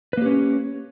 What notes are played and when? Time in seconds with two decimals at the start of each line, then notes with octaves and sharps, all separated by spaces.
0.13 B4
0.17 A#3
0.22 G4
0.26 C#4